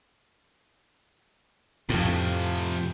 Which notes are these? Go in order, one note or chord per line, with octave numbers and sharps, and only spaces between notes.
F2 A2 C3 F3